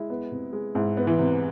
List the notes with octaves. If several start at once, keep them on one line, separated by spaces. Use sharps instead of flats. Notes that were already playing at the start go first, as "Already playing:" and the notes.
Already playing: G#3 E4
B3
C3
G#3
G#2 E4
B3
E3
C3